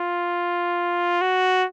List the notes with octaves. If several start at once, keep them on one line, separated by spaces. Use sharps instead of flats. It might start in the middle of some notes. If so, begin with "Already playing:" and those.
Already playing: F4
F#4